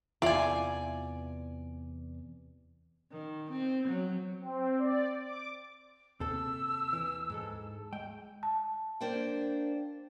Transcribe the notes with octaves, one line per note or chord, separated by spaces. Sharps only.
E2 C3 E3 E4 F4 D5 G#5
D#3
C4
F#3
C4
D5
D6
D#2 C3 A4 E6
E3
G#2 G#3 A4
G#3 G5
A5
A#3 D4 C5 D5 G5